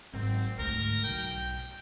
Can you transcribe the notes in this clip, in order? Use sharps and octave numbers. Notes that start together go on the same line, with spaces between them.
G#1 F#3 C4
D2 G#2 A#4
B1 G5